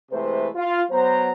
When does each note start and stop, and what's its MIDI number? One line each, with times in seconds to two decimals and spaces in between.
0.11 0.48 48
0.11 0.48 52
0.11 0.48 56
0.11 0.48 57
0.11 0.48 71
0.11 0.48 72
0.56 0.82 65
0.91 1.32 54
0.91 1.32 59
0.91 1.32 72
0.91 1.32 82